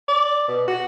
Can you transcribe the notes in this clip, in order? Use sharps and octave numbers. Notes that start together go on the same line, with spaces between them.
D5
B2
F#4